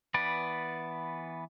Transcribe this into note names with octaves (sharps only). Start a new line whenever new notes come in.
E3 B3 B4 D5